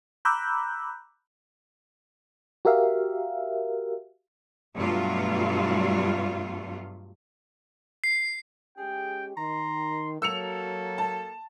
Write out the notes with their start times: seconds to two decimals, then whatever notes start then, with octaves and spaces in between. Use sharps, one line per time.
0.25 A#5 B5 D6 E6 F#6 G6
2.65 F#4 G4 A#4 E5 F5
4.75 G2 B2 F#3 G3 A3 F4
8.04 C7
8.78 G#3 C#4 G4 G#4 G5
9.37 D#3 A#5 C6
10.22 F#3 A#3 A4 E6 C#7 F7
10.98 A5